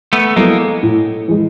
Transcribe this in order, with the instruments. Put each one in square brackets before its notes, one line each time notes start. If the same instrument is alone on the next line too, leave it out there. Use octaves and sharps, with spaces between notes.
[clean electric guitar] A3 B3
[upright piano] F#3 B3 E4 A4 [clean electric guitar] G#3 A#3
[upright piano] A2
E3 G#3